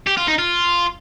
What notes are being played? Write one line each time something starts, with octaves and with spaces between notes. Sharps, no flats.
G4
F4
D#4
F4